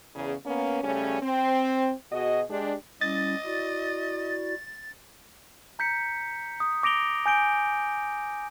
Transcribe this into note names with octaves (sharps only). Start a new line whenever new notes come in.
E2 C#3
A#3 B3 C#4
C#3 G3 A3 C#4
C4
B2 F#4 G#4 D#5
G#3 D4 G4
G3 C#4 E4 D#5 A6
E4 F#4 D5
A#5 G6 B6 C#7
D#6
D6 A#6 D7 F7 G7
G#5 G6 D7 G7